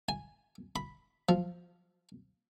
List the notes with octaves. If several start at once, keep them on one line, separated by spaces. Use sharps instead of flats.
G#5
B5
F3